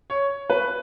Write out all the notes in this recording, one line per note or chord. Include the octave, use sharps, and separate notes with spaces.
C#5
B4